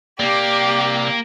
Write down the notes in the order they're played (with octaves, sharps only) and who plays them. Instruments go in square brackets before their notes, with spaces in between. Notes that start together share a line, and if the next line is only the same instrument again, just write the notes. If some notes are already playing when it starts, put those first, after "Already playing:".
[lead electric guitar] C3 D5 [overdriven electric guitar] A#3 [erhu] G4